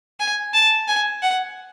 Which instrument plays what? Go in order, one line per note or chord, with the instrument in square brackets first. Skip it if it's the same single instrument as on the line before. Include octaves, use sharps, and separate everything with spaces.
[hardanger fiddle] G#5
A5
G#5
F#5